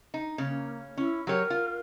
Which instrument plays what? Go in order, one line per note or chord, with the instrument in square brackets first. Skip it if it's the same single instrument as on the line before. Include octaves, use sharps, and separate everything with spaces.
[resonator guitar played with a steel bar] D#4
[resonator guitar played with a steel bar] C#3 C#4 [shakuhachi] A#3
[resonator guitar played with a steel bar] C#4 [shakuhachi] E4
[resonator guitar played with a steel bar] F#3 G4 C#5 [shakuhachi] A#4
[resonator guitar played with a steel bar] F4